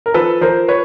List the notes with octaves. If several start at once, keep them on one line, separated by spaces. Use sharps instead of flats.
A#4
F3 A4 B4
F3 A#4 C5
B4 C#5